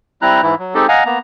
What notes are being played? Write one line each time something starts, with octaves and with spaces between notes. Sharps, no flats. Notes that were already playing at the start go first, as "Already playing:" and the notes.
G3 C4 E4 A#5 F#6
G#2 E3 E4
F#3
G#3 C4 D#4 G4 A4
D#5 F5 F#5 G#5 A#5
A#3 B3 A#5